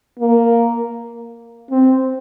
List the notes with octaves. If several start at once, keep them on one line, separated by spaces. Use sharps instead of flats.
A#3
C4